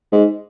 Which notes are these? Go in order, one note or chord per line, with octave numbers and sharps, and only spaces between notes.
G#2